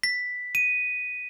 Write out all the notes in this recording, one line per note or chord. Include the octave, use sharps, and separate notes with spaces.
B6
D#7